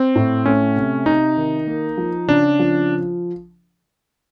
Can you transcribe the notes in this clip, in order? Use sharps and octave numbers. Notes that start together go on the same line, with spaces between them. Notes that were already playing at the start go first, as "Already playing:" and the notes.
Already playing: C4
A2
A3 C#4
C3
C3 D#4
D#3
A#3
F3
C#3 D4
F3